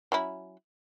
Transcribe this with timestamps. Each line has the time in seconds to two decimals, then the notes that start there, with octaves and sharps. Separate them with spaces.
0.12 F#3 C#4 E4